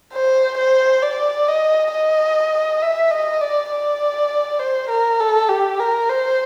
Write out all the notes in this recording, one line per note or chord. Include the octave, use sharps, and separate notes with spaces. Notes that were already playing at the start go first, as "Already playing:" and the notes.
C5
C5
D5
D#5
D#5
E5
D#5
D5
D5
C5
A#4
A4
G4
A#4
C5